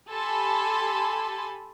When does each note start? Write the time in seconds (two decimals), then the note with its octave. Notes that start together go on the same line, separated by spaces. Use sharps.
0.11 G4 A4 G#5 A5 B5 C6